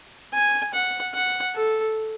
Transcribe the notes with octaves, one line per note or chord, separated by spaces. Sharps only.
G#5
F#5
F#5
A4